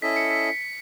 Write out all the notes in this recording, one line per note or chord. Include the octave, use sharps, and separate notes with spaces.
C#4 E4 A4 D#5 B6
C#7
B6